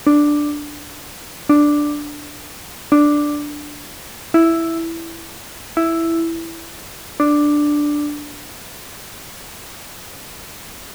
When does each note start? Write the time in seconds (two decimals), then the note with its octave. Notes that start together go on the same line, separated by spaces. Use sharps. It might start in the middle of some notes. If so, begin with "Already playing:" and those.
0.07 D4
1.49 D4
2.92 D4
4.34 E4
5.77 E4
7.20 D4